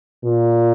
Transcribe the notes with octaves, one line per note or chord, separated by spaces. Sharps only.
A#2